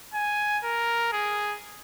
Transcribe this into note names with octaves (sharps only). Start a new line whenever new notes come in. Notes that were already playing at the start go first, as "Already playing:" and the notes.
G#5
A#4
G#4